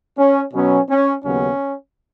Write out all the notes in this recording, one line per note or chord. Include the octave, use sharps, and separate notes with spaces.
C#4
B2 F#3 B3 C#4
C#4
D#2 C#3 F#3 B3 C#4